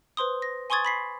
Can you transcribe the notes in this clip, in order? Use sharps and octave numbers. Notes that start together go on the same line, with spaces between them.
B4 C5 C6 D#6
A#6
G#5 C6 C#6 D#6 G#6 A6
B5 B6 C7